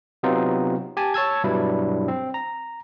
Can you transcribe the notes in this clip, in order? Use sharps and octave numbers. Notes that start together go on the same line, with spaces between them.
C3 F#3 B3 C4 D#4 F4
G4 G#5 A5
C#5 A5 E6 G#6
G2 B2 F#3 G3 D4 E4
C4
A#5